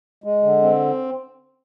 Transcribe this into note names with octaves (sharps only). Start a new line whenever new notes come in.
G#3
D3
C4